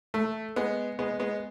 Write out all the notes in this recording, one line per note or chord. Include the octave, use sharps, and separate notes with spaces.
A3
G#3 B3
G#3 B3
G#3 B3